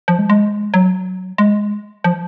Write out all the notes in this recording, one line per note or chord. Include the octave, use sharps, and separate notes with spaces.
F3
G#3
G#3
F#3
G#3
F3